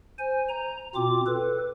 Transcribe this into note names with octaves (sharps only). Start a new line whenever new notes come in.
C5 G#5
A#5
B2 C4 F4 D6
A4 B4